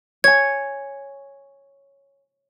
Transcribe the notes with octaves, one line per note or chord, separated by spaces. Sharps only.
C#5 G#5 G#6